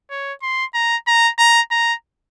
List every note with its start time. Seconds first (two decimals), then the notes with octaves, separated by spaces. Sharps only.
0.11 C#5
0.43 C6
0.74 A#5
1.07 A#5
1.38 A#5
1.71 A#5